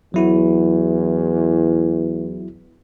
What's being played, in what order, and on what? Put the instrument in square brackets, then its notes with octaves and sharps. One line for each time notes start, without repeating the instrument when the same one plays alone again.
[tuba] E2 [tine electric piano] F#3 E4 F#4